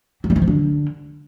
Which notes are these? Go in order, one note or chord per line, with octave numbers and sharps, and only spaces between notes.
F#3
G3
E3
F3
D3